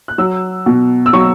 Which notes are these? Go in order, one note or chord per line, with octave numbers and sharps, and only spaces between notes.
F#6
F#3 E6
B2
E6
F#3 C#6